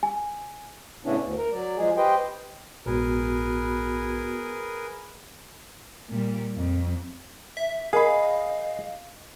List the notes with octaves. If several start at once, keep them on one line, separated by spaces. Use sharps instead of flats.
G#5
A2 C#3 B3 C#4 D4 E4
D2
A#4
F#3 D5
F3 G#3 G#4
G4 B4 C5 D#5 G5
A#1 G#2 B3 F#4 G#4 A#4 B4
A#2 G3
F2
E5
G#4 A#4 D#5 F5 B5